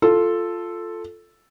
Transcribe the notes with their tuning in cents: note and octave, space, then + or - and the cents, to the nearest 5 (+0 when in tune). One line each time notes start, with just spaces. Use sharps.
F4 +0 A4 +0